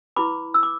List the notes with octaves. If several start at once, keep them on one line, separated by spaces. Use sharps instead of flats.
E4 B4 B5 D6
E6
D6